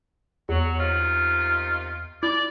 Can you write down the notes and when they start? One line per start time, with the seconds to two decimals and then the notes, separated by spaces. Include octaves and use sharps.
0.49 E2 F#3
0.78 C3 D#3 F4
2.23 E4 D5